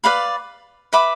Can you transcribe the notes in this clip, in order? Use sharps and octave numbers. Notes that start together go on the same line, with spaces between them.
B4 D5 F5 B5
B4 E5 B5 D6